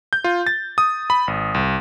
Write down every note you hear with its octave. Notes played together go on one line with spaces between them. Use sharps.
G6
F4
A6
D#6
B5
G#1
C2